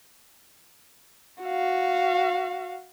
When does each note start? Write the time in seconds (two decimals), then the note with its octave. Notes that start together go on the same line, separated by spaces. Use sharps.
1.43 F#4 F5